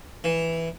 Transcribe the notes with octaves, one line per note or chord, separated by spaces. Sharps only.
E3